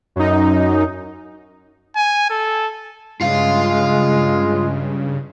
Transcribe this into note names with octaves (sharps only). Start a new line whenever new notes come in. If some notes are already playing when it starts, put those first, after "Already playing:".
F#2 D#4
G#5
A4
G2 C#3 G#3 F4 F5